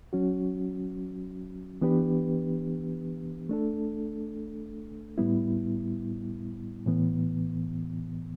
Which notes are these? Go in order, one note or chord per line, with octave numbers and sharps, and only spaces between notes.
F#3 C#4 F#4
E3 B3 D4 G4 B4
A3 D4 A4
A2 G3 B3 E4
A2 E3 B3